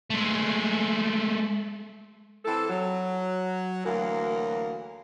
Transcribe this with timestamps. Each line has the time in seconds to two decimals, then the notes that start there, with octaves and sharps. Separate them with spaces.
0.10 G#3 A3
2.45 E3 C4 E4 A4
2.69 F#3
3.85 D2 E3 F#3 A#3 F#4 A#4